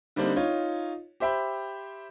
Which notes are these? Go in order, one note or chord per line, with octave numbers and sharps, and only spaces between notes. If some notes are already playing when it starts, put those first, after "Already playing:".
D3 G3 A#3 C4 D4 D#4
D#4 F4 C#5
G4 C5 E5 G5 B5